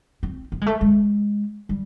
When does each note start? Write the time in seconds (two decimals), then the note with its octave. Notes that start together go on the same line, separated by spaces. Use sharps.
0.23 C4
0.52 B3
0.61 G#3
0.66 A3
0.81 G#3
1.69 G3